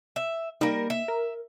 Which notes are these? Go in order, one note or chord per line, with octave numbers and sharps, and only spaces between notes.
E5
G3 A#3 D#4 A#4
E5
A#4